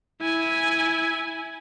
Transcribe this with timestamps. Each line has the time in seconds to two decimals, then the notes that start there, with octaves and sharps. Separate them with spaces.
0.21 E4 G#5